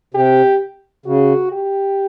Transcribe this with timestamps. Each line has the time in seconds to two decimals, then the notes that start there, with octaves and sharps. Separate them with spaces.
0.14 C3 G4
1.06 C#3 F#4
1.51 G4